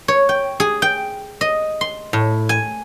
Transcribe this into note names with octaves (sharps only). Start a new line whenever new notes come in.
C#5
G5
G#4
G5
D#5
C6
A2
G#5